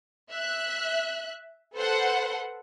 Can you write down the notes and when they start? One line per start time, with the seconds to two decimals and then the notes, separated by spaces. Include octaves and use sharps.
0.31 E5 F#6
1.75 A4 B4 C5 F#5